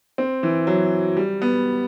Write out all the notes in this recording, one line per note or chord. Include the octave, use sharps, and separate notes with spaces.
C4
E3
F#3
G3
B3